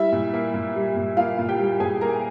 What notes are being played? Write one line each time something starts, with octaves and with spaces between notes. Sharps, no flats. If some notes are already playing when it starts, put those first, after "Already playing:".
Already playing: G3 E4 E5
A#2
A#3
A#2
G3
A#2
A#3 F4 F5
A#2
G4 G5
G3
A#2 G#4 G#5
A#3 A#4 A#5